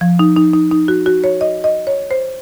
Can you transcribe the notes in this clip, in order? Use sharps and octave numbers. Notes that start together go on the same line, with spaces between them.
F3
D#4
D#4
D#4
D#4
F#4
F#4
C#5
D#5
D#5
C#5
C5